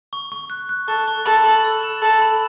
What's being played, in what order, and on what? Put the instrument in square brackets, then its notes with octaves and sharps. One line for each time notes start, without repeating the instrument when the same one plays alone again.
[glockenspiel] C#6
C#6
F#6
F#6
[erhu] A4 [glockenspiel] C#6
[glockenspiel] C#6
[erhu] A4 [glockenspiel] B5
[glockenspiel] F#7
E6
E7
[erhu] A4 [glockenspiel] B5
[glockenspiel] B5